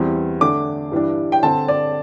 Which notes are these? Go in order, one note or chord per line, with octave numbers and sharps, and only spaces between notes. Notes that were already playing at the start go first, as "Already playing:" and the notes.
Already playing: E2 E3 G3 C4
D3 A3 D4 D6
G2 E3 G3 D4
G5
D3 C4 A5
D5